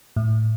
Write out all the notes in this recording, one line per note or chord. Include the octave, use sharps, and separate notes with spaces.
A2